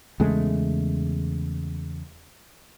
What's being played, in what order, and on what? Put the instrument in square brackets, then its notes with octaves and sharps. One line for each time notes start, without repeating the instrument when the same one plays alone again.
[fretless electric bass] E2 C#3 G#3 A3